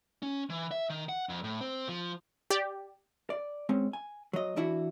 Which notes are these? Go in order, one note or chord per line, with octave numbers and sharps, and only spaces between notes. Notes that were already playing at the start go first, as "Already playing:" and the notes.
C#4
E3
E5
D#3
F#5
F2
A2
C4
F3
G4 D5
D5
G#3 C4 C#4
G#5
F#3 D#5
E3 D4 E4 F#4